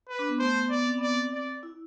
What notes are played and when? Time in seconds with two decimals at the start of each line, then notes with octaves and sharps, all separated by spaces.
0.09 B4
0.19 D4
0.28 B3
0.39 A3 C5
0.55 B3
0.70 B3 D5
0.85 C4
0.98 B3 D5
1.10 C4
1.32 D5
1.63 E4